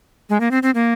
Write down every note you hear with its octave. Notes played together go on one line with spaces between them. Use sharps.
G#3
A#3
C4
C4
A#3